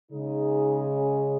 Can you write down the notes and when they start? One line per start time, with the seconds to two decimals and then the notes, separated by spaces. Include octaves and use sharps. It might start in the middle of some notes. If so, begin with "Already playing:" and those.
0.11 C#3 G#3 D#4
0.95 C#4